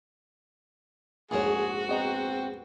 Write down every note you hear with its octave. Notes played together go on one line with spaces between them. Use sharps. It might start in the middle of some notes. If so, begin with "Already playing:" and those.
A#1 F2 G#2 A3 F#4 G#4 A#4 C#5
B3 C4 D#5 A#5